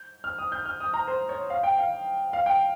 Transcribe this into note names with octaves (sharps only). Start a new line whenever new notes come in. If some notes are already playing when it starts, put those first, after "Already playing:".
Already playing: G6
F6
D#6
G6
F6
D#6
A#5
C5
C#5
F5
G5
F5
F5
G5